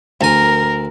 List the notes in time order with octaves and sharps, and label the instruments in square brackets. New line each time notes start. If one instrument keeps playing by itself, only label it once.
[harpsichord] D2 G#5 [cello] A#4